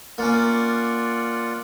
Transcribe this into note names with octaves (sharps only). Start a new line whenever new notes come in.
A#3 C#4 F4 D5 F#5